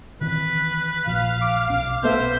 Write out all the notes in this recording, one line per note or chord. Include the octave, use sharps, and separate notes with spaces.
D#3 E3 C4 B4
A#1 F3 F5
D6
B1 C#4
B1 A3 B3 A4 C5 E5